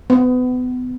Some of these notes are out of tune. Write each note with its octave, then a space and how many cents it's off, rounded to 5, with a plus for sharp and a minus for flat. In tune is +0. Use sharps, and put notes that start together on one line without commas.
B3 +30